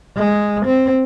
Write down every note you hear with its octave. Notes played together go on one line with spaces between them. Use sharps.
G#3
C4